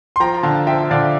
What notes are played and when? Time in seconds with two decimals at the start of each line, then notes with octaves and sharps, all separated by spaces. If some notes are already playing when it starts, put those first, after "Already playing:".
0.16 C6
0.20 F3 G5 A#5
0.43 D3 F5 A5
0.67 F3 E5 G5
0.91 D3 D5 F5